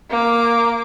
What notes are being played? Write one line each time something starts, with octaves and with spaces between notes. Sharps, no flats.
A#3 D6